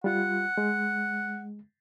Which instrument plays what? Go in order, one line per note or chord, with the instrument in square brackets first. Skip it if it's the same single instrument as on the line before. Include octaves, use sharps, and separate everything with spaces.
[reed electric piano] G3 F4 [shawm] F#5
[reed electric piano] G#3